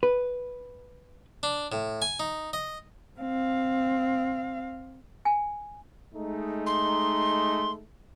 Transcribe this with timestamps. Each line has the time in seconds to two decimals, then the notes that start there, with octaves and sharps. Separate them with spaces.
0.03 B4
1.43 D4
1.72 A2
2.02 G#5
2.20 D#4
2.53 D#5
3.20 C4 F5
5.25 G#5
6.14 G#3 A3 D#4
6.66 C6